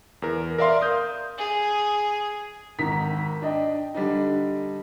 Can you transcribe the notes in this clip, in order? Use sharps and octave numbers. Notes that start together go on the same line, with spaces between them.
E2 A#4
A#4 D5 E5 F5 C6
D#6 G6
G#4
G#1 D#3 A#5 B6
D4 D#5 G5
D3 G3 D4 D#4